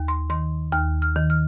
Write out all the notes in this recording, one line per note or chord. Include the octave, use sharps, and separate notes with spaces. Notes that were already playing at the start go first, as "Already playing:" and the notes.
Already playing: D#2
C6
D#3 C6
D#2 F6
F6
D#3
F6